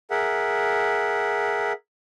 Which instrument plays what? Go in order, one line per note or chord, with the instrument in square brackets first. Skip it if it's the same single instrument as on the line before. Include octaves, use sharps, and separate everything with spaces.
[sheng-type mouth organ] G#4 A#4 E5 F#5